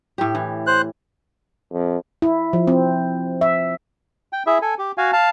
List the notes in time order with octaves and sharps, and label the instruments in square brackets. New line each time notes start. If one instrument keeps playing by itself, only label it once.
[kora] A2 G4
E3
[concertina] C5 F#6
[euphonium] F2
[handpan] E4
F3
C4
E5
[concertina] G5
E4 G#4 E5
A4 G#5
G4
F#4 F5 G#5
F5 A5